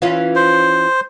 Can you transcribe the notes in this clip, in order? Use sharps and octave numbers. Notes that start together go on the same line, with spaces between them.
E3 C#4 F4
C5